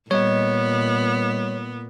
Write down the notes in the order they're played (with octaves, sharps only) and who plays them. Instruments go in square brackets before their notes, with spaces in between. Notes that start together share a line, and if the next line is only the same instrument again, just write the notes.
[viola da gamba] A#2 [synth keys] G3 D#5 [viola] B3 [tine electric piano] C#5